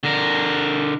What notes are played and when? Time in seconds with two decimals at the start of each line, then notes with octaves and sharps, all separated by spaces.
0.04 D3 A#4